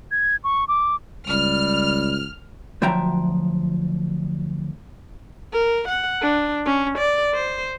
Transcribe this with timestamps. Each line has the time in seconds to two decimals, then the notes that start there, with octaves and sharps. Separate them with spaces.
0.11 G#6
0.44 C#6
0.68 D6
1.28 C#2 G3 F6
2.82 D2 F3 F#3 E5 G5 A#5
5.53 A#4
5.88 F#5
6.21 D4
6.66 C#4
6.98 D5
7.34 C5